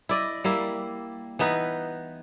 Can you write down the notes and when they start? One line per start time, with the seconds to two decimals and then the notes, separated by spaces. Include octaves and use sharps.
0.09 E4 D5 D#5
0.44 G3 A#3 E4
1.39 E3 B3 D#4 B4